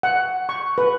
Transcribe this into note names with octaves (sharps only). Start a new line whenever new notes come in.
F#5
C#6
B4